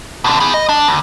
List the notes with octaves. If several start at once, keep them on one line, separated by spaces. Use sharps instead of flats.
B2 D3
B3 G#4
D#5
D4
D2